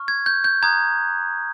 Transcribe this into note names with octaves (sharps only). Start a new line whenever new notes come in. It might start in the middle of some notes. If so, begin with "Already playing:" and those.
Already playing: C#6 F6
G#6
G6
G6
A#5 D#6 F#6 G#6